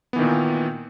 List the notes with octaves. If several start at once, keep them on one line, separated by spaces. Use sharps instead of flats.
A#2 D#3 E3 B3